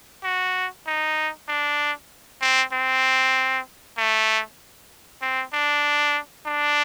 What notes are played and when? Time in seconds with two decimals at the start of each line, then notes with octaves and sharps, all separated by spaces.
0.23 F#4
0.86 D#4
1.48 D4
2.41 C4
2.72 C4
3.98 A3
5.22 C4
5.53 D4
6.46 D4